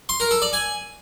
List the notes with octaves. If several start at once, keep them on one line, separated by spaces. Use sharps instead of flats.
C6
A#4
A4
D5
G#5